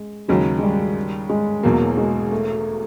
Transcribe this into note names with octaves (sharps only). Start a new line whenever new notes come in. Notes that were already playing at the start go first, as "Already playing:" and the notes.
Already playing: G#3
D#2 C#3 F#3 G#3
G#3
G3
G#3
E1 E2 B2 F#3 A#3
G#3
A3